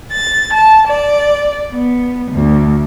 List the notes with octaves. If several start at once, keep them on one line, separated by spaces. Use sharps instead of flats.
A6
A5
D5
B3
D2